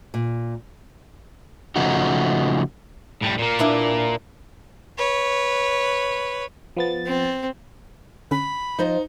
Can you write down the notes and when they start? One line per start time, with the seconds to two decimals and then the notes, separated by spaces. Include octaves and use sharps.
0.14 A#2
1.76 C#3 F3 A3 D#4 F#4
3.22 A2 G3
3.39 A#2 A#3
3.59 D4 E4 B4
4.98 B4 C#5
6.77 F3 B3 A6
7.06 C4
8.31 D3 C#4 B5
8.79 F3 D#4 C5 D#5